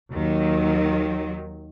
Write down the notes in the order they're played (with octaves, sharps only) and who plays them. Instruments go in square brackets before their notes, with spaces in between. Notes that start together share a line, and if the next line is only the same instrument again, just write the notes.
[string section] D#2 D#3 F#3